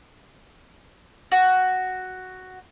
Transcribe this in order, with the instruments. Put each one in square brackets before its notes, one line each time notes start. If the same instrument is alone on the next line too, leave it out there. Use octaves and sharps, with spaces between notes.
[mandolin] F#4